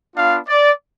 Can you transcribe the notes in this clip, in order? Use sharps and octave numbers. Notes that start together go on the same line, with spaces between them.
B3 D4 F4 F5
D5